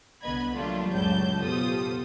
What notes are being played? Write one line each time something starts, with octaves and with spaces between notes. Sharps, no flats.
C2 D3 B3 D#5 B5 G#6
F#3 G3 A3 A#3 D4 F4
C#2 F#2 A2 F#3 A5 G6
B2 F4 G4 A4 C5 D#6